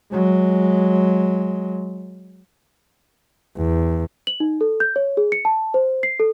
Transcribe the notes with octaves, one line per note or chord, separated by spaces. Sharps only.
F#3 G#3
E2
F#7
D#4
A4
G6
C#5
G#4
C#7
A5
C5
C7
A4